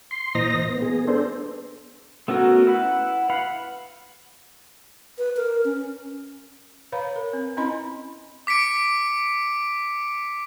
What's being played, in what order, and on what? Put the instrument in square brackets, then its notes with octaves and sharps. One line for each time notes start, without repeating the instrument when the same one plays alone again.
[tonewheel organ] C6
A#2 E3 C5 D#5 A#5 A#6
B3
B3 G#4
B3 D4 A4 C5
[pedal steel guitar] A3 B3 C#4 F#4 A#4
E4 B4 F#5
F5 F#5 B5
[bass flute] B4
A#4
C#4
[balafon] B4 C#5 F5 A#5 B5
A#4
C4
C4 C#4 E4 D#5 B5 C6
[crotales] D6 B6 C#7 D7